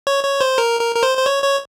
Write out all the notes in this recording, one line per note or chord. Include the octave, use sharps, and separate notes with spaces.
C#5
C#5
C5
A#4
A#4
A#4
C5
C5
C#5
C#5